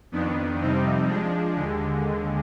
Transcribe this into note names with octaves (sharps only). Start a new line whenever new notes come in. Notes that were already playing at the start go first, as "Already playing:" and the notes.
F2 D#3 B3 D4
F2 C3 G3 C4 D#4
F3 G#3 D4
D#2 D3 G#3